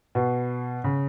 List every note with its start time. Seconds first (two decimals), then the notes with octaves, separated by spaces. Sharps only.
0.15 B2
0.84 C#3